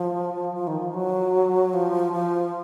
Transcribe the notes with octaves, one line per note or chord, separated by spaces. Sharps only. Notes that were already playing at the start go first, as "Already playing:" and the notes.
Already playing: F3
F3
D#3
F3
F#3
F3
F3